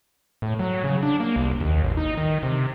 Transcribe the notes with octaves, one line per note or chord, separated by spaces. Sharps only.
A2
F#3
C#3
D4
A#3
C2
D#2
A1
D#4
D#3
C3